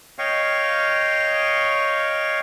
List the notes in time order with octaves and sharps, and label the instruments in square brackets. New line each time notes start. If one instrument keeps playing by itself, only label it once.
[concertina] C#5 D#5 F5 G5 C#6